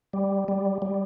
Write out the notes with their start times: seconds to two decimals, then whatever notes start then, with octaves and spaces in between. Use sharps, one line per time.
0.13 G3
0.48 G3
0.82 G3